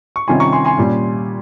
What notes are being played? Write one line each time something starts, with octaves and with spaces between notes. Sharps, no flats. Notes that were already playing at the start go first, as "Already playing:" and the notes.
C#6
C3 D#3 G3 C#4 F4 G#5 C6
A#5 C#6
G#5 C6
G#5 C6
A#2 G3 C#4